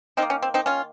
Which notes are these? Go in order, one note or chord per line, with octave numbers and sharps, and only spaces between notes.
D#3 C4 D#4
A#3
C#4
C4
C4 D#4
C#4 F4